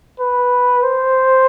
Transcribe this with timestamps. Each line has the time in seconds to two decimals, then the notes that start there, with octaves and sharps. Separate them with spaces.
0.20 B4
0.83 C5